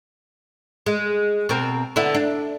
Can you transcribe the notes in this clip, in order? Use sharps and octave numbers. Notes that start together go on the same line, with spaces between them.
G#3
B2 C4 A#4
D3 B3 E4
D4